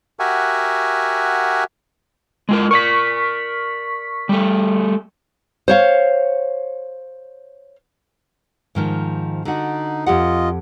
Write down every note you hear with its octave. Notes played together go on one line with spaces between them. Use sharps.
F#4 G4 A#4 E5 F#5 G#5
G#3 F4 A#4
A#4 D5 C#6 B6
G3 A3
C5 C#5 F5
G#2 D#3 F3
D3 D#4 F#4
F2 F4 G4 D#5 F#5